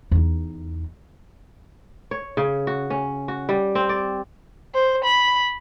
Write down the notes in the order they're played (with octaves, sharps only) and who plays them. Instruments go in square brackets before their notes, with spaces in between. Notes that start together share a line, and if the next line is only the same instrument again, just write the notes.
[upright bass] E2 D#4
[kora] C#5
C#3
F#4
C#4
F#4
G3
C4
D5
[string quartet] C5
B5